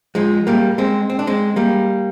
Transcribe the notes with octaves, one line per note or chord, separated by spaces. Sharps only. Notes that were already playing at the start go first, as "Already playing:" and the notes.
F3 G#3
G3 A#3
G#3 C4
C4
D4
G#3 C4
G3 A#3